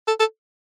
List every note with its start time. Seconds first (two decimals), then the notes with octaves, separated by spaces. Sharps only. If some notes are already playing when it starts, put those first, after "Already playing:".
0.08 A4
0.20 A4